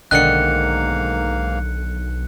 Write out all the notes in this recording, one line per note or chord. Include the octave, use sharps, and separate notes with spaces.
B1 G#2 D3 D#3 A#3 F5 F#6 C#7